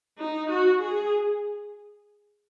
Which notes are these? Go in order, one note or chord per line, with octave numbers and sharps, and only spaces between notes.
D#4
F#4
G#4